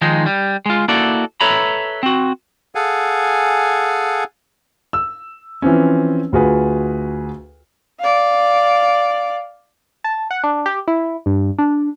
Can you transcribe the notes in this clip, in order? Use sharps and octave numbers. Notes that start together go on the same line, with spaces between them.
D#3 F3 G#3 D#4
G3
G#3 F4
A#3 E4 F#4 A4 D5
A4 B4 C#5 E5 A#5 B5
C4 F#4
G#4 A4 F5 F#5 G#5
E6
E3 F3 C4 C#4
D2 F4 F#4 G#4 B4
D5 F5
A5
F#5
D4
G4
E4
G2
D4